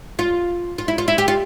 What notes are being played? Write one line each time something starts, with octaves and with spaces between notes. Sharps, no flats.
F4
F4
E4
F4
E4
G4
F4